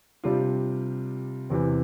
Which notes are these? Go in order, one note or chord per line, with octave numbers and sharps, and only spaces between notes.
C3 G3 D4 F4
E2 C3 E3